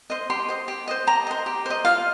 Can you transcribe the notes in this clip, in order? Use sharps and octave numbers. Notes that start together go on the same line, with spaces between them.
C5 D#5
G4 C6
C5 D#5
G4
C5 D#5
G4 A#5
C5 D#5
G4
C5 D#5
F4 F5